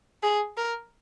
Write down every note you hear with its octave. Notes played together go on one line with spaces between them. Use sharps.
G#4
A#4